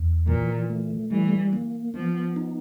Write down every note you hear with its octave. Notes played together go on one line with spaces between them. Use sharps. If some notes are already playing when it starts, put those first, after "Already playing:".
Already playing: E2
A#2 E3
A3
E3 G3
A#3
F3 B3
D#4